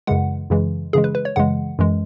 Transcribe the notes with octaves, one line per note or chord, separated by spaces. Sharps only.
F#2 C#3 E3 G#3 F#5
F#2 C#3 E3 G#3
F#2 C#3 E3 G#3 G#4
B4
B4
C#5
F#2 C#3 E3 G#3 F#5
F#2 E3 G#3